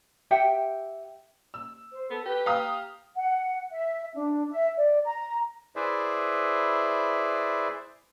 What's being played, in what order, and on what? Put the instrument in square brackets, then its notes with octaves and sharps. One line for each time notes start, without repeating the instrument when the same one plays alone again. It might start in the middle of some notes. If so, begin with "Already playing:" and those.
[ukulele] G4 E5 F#5 G5
[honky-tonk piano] E6
[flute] C5
[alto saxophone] B3 [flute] A4
[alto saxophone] G4 [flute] B4
[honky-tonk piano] F5 A#5 D#6
[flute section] F#5
E5
D4
E5
D5
A#5
[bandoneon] E4 G#4 B4 C5 D5 E5